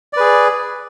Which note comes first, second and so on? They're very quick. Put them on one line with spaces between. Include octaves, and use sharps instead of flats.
D5 B4 G#4